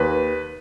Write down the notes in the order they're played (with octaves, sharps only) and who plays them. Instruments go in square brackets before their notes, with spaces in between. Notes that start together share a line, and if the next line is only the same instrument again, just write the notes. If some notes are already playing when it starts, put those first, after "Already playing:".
Already playing: [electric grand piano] D#2 B4